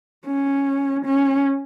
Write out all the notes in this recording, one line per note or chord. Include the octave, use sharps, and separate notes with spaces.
C#4
C#4